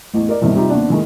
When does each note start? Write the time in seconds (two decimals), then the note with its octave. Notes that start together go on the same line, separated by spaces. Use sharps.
0.14 A1 E2
0.29 A#4 D5 D#5
0.41 D#1 E2 G2 C3 D#3
0.55 C3 G3 D#4 F4
0.70 D#2 B3 C4 D4
0.89 A2 D#3 G#3 A#3